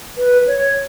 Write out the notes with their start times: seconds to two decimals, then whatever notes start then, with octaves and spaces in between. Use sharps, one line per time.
0.18 B4
0.47 C#5